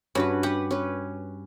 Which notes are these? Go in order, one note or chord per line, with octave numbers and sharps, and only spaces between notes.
G2 C#4 F#4 B4
G4 B4 F#5
C#4 B4